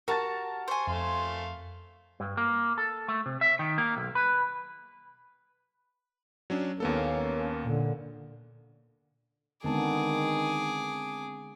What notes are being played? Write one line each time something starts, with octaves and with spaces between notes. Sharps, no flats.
F#4 G4 A#4 A5 A6
C5 G#5 C6 C#6
F2 A3 F5 C6
G2
A#3
A4
A3
C3
E5
D#3
A#3
B1
B4
F#3 C#4 D4
D#2 A#3 B3 C#4 A4
A#2 D3
D3 D#3 G#3 B3 C4 G#4 A5 D6